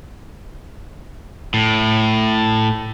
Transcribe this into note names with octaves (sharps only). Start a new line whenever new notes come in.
A2